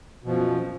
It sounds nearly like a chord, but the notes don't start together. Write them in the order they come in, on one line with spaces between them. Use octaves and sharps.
B2 F3 F#2